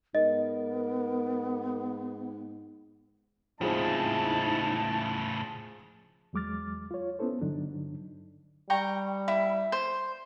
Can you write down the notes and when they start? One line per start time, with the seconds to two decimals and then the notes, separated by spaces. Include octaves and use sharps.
0.15 G#2 B3 A#4 D#5
3.61 A2 C#3 F3 G#3 C4 D#4 E4 A5
6.33 E2 F#3 G#3 D6 F6 A6
6.91 F4 C#5
7.19 B3 C#4 E4 A4 C5
7.41 G2 D3 F#3 D4 D#4
8.70 G3 G5 A#5 C#6
9.28 E4
9.72 C5